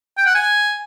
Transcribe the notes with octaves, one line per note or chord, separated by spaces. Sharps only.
G5
F#5
G#5